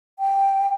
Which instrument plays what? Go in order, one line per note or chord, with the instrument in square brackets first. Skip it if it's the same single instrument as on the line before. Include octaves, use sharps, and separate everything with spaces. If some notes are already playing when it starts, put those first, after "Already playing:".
[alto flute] G5